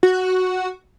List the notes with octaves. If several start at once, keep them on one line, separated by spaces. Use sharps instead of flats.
F#4